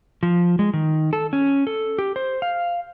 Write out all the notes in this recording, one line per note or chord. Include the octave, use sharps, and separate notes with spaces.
F3
G#3
D#3
A4
C#4
A4
G4
C5
F5